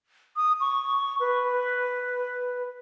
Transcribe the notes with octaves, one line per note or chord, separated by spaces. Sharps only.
D#6
C#6
B4